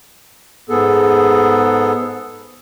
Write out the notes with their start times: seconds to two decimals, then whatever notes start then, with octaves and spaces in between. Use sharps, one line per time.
0.69 G#2 B3 G#4 A4